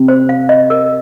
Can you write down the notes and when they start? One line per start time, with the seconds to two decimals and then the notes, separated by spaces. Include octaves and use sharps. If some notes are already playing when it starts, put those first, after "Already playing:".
Already playing: C3
0.08 C5
0.29 F5
0.49 D#5
0.70 A#4